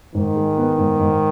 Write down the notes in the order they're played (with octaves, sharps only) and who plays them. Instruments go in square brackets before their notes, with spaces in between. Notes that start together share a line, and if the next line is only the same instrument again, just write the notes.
[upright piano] G#2 [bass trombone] D#3
[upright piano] G#3
B3
G#2
G#2